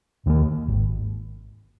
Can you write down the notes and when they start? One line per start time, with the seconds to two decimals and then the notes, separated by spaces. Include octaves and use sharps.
0.26 D#2 D#3 A#3
0.68 G#1